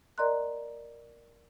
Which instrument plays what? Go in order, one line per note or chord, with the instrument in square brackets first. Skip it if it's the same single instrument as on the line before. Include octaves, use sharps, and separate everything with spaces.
[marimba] A#4 D5 D#5 A#5 C6 F#6